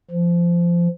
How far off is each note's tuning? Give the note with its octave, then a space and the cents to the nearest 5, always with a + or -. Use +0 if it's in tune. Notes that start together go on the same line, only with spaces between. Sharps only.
F3 -20